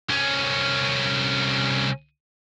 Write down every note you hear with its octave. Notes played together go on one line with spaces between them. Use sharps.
C2 C#4